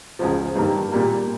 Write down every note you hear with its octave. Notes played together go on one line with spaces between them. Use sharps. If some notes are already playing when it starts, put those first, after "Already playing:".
C#2 C#3 F3
G2 D#3 G3 A#3
A#2 G3 A#3